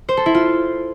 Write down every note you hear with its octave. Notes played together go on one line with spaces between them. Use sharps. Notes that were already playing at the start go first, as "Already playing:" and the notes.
C5
A4
E4
F4